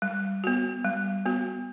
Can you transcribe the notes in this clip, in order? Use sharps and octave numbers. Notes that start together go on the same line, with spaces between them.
G3
B3 F#4
G3
B3 F#4